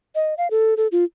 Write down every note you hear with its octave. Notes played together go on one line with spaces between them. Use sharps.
D#5
F5
A4
A4
F4